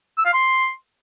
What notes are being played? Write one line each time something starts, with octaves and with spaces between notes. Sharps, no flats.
E6
F5
C6